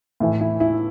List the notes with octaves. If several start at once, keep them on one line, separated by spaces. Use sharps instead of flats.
A2 E3
E4
E4